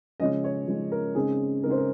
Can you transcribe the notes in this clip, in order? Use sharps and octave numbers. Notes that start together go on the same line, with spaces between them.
C#3 F3 G#3 C#4 D#5
C#5
C#3 F3 G#3 C#4
A#4
C#3 G#3 C4 D#4 G#4
C#3 G#3 C4 D#4 A#4
C5
A#4